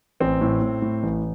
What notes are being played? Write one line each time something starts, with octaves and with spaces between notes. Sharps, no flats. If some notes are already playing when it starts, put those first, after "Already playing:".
A1 C4
A2
A2
A2
A1